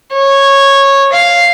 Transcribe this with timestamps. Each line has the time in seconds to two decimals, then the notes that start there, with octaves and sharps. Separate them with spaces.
0.12 C#5
1.12 F5